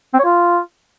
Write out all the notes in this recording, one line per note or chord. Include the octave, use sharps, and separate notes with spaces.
C4
C#5
F4